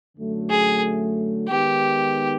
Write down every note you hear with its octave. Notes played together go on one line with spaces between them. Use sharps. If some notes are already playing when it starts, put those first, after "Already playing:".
F#2 D3 F#3 A3
G#4
D#3 G#3 B3 D#4 G4